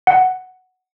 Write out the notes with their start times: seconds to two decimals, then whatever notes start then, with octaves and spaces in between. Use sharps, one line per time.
0.07 F#5